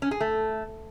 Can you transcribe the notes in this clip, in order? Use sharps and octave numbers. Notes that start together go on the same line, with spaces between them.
C#4
G#4
A3